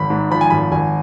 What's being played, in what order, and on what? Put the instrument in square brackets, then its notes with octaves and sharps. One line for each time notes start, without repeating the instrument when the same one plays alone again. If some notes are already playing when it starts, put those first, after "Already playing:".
Already playing: [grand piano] G#1 B5
G#2
F3 B5
G#5
G#1 B5
G#1 G#5